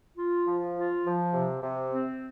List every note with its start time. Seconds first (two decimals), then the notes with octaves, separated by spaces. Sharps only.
0.17 F4
0.46 F3
0.75 F4
1.05 F3
1.32 C3
1.62 C3
1.90 C4